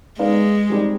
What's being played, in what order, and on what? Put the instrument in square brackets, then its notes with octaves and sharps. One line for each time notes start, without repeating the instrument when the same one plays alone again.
[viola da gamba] G#3 [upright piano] B3 D#4 B4 D5 F5
[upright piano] G3 C4 D#4 G4 D5